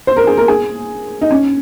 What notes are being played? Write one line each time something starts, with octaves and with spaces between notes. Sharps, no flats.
C5
A#4
G#4
A#4
G#4
D#4
C#4